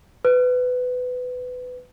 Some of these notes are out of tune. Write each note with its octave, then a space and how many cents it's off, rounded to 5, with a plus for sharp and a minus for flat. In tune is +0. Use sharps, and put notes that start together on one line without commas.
B4 +20